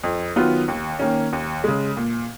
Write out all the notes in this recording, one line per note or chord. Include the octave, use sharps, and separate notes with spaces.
F2
D#3 F#3 B3 F4
D#2
D#3 A#3 C#4
D#2
C#3 G#3
A#2